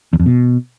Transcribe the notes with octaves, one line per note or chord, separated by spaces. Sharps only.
E2
F2
B2